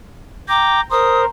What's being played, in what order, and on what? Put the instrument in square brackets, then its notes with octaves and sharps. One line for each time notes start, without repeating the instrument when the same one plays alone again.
[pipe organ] G5 A#5 [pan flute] D6
[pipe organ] A#4 C5 [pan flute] D#6